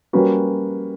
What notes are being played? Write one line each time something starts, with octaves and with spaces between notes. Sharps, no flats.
G3 A#3 C#4 F#4 B4